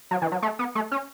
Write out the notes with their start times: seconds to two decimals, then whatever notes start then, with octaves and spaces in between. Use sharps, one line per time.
0.11 F#3
0.22 E3
0.32 F#3
0.42 A3
0.59 B3
0.75 A3
0.92 C#4